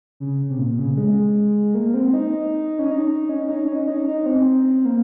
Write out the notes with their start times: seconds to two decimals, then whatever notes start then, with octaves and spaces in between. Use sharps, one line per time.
0.20 C#3
0.50 C3
0.59 A#2
0.79 C#3
0.97 G#3
1.75 A#3
1.94 C4
2.13 D#4
2.79 C#4
2.91 D#4
3.29 C#4
3.49 D#4
3.68 C#4
3.87 D#4
4.07 D#4
4.26 C4
4.85 A#3